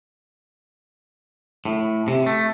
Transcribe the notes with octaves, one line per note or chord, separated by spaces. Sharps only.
A2
C3
A3